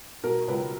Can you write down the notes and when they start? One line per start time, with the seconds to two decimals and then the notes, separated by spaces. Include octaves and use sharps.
0.24 B2 A#4
0.48 C#2 B4